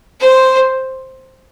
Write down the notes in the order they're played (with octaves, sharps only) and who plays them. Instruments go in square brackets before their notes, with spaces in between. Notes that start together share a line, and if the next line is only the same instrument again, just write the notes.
[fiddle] C5